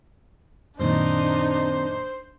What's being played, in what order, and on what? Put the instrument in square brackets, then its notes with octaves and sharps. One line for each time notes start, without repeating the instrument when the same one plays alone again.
[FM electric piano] F#2 A#2 [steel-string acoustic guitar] D#3 C4 [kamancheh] D4 D#4 [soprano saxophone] C5